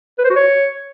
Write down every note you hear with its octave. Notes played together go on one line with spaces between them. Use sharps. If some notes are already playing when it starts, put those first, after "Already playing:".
B4
C5
F#4
C#5